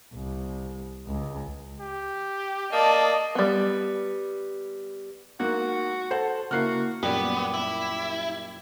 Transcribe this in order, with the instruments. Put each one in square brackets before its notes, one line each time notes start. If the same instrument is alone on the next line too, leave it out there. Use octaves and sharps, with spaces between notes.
[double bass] C2
C#2
[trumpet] G4
[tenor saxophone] A#3 [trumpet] D5 [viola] D#5 [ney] A5
[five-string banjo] G3 B3
[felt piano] G#2 A#3 [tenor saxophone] F#4 [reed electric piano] F#6
[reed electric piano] A4 A5 [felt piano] C5 F#5
[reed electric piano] C#3 A#3 E4 [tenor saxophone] F#4 [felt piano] F6 F#6 C7
[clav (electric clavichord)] F#2 A#2 G3 [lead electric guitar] B3 [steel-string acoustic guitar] G4
[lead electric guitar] E4